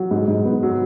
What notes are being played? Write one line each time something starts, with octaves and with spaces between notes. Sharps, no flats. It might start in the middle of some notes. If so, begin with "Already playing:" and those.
Already playing: F#3
G#2
G#2
B3
F#3